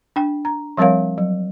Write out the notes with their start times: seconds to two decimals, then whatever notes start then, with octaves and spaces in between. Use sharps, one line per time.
0.16 D4 G5
0.45 A#5
0.77 F3 G3 C4 A#4 C#5 F5
1.18 F#3